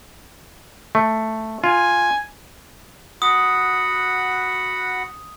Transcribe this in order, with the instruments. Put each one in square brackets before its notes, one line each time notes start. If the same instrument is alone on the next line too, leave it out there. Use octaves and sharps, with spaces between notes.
[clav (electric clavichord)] A3
[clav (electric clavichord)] F4 [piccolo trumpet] G#5
[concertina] F#4 F#5 B5 [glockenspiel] D#6